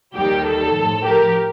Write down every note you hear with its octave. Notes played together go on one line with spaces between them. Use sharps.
D#2 D#3 G3 G4
A4
A2 F3
G4 A#4